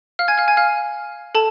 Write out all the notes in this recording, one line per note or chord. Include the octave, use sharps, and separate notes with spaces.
F5 F6
G#5 G#6
F5 F6
G#5 G#6
F5 F6
A4 A5